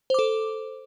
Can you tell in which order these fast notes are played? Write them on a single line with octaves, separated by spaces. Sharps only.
C5 D6 A4